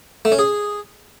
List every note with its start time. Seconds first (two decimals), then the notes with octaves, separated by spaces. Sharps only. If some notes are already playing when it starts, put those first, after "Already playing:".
0.25 A3
0.32 C#4
0.39 G#4